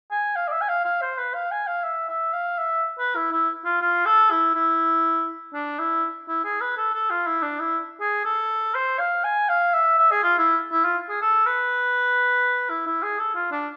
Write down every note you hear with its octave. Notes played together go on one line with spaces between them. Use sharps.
G#5
F5
D5
E5
G#5
F5
F5
C5
B4
F5
G#5
F5
E5
E5
F5
E5
B4
E4
E4
F4
F4
A4
E4
E4
D4
E4
E4
G#4
B4
A4
A4
F4
E4
D4
E4
G#4
A4
C5
F5
G#5
F5
E5
E5
G#4
F4
E4
E4
F4
G#4
A4
B4
E4
E4
G#4
A4
F4
D4